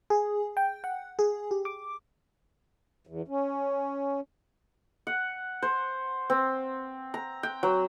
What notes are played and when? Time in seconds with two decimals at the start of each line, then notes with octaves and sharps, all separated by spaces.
0.10 G#4
0.57 G5
0.84 F#5
1.19 G#4
1.51 G4
1.65 D6
3.07 E2
3.28 C#4
5.07 F#5
5.62 C5
6.30 C4
7.14 A#5
7.43 G5
7.63 F#3